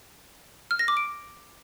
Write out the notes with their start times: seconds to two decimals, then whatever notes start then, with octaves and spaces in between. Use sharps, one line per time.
0.71 F6
0.79 A#6
0.88 D6
0.97 D7